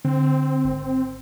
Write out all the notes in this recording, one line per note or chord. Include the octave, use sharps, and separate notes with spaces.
D3 C4
G#1